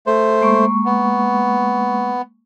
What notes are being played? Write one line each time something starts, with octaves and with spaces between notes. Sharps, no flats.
A3 C5
G#3 A#3 C#6
B3